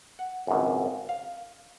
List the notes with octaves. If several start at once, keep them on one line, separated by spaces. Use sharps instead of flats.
F#5
G#1 C#2 F#2
F5